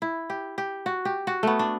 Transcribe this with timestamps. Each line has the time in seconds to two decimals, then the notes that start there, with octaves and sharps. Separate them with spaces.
0.02 E4
0.30 G4
0.58 G4
0.86 F#4
1.05 G4
1.27 F#4
1.43 A3 B3
1.59 D4